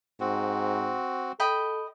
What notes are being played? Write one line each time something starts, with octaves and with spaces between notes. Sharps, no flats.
G#2 C4 F#4
A4 D#5 G5 B5